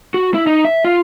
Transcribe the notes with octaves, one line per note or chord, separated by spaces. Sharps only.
F#4
E4
D#4
E5
F4